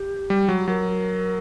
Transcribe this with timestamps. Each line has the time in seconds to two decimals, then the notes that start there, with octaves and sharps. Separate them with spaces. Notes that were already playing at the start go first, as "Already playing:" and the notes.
Already playing: G4
0.30 G3
0.49 F#3
0.68 F#3 A#4